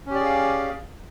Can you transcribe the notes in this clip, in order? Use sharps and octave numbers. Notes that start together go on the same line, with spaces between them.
C#4 G4 G#4 D5 F5